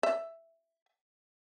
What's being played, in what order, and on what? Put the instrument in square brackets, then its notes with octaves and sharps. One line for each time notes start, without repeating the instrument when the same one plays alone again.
[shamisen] E5